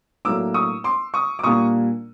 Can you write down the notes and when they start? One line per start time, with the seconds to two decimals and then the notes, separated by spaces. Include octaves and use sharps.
0.25 A2 F#3 A#3 D4 D6 E6
0.54 C#6 D#6
0.84 C6 D6
1.14 C#6 D#6
1.39 D6
1.43 A#2 G3 A#3 D4 C#6 D#6